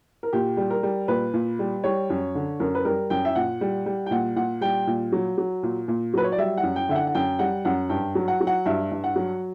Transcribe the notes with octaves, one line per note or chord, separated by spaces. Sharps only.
A#4
A#2 G4
G3
A#4
G3
A#2 B4
A#2
G3
G3 C#5
F#2
D3
F#2 A#4
B4
G3 A#4
F#2 G5
E5
A#2 F#5
G3
G3
G5
A#2 F#5
A#2 F#5
G3 G5
A#2
F#3
F#3
A#2
A#2
F#3 B4
C#5
D5
G3 E5
F#5
F#2
G5
D3 E5
F#5
F#5
F#2 G5
G3 F#5
F#2 F#5
G2 G5
F#3
F#5
F#3
F#5
G2 E5
G2
F#5
F#3